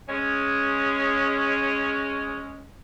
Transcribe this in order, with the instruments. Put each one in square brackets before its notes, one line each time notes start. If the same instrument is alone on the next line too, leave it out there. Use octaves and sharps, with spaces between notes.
[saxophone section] G#3 C#4